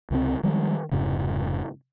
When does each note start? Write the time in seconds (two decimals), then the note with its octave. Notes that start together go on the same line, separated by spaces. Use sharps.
0.11 C#2 C3 F3 C4
0.43 D#3 F3 G3 G#3
0.92 F1 F2 G#2 C#3